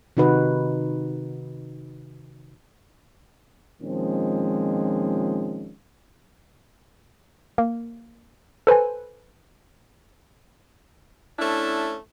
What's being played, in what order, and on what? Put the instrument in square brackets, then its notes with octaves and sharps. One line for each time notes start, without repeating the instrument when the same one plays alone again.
[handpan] C3 D#3 D#4 F#4 B4
[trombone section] A#2 D#3 F3 G#3 C4 C#4
[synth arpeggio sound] A#3
A4 B4 C5 G#5
[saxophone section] A3 C#4 D4 E4